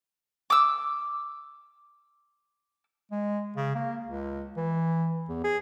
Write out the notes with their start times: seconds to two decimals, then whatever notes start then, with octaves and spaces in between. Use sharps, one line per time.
0.50 D6 E6
3.12 G#3
3.56 C#3
3.75 A#3
4.07 C#2
4.57 E3
5.29 E2
5.44 G#4